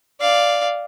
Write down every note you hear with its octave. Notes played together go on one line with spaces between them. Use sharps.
D5 F5